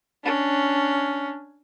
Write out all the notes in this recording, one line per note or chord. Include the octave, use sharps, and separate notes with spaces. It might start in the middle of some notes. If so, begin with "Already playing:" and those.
C#4 D4